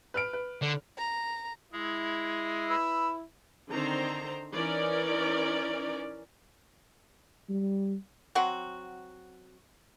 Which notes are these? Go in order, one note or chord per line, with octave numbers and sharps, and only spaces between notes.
B4 F6 D7
B4
D3
A#5
G#3 E4 G#4
B4 E6
D3 D#3 C4 C5 A#5
E3 C#4 D#4 A#4 D5
G3
F#3 C4 F#4